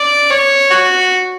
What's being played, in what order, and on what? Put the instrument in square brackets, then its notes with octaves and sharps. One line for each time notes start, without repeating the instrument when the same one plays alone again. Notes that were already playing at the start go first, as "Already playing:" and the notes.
Already playing: [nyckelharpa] D5
C#5
F#4